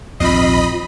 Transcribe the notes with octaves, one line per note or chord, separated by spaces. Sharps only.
A#1 D#2 G#2 C4 F4 D#5 B5 C7